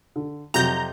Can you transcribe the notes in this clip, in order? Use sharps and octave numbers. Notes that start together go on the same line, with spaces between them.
D3
F2 C3 F#3 A#5 G6